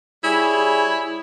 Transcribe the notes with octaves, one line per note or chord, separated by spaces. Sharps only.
G3 E4 G#4 C#5